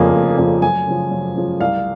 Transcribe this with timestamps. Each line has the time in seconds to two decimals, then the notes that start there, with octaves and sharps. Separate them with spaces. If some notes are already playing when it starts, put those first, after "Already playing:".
Already playing: F1 F2 C#3 F3 A#3 G#5
0.12 F1
0.38 F2 C#3 F3 A#3
0.62 F#2 G#5
0.86 C#3 F3
1.11 F#2
1.36 C#3 F3
1.60 C2 F5